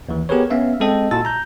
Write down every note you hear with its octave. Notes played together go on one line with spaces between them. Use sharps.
D#2 E3
B3 G4 G#4 A#4 B4 C#5
B3 C#4 E5 F5
G#3 C4 A4 D#5 G5
A#2 E4 F#4 A5 E6 A6
A#5 G6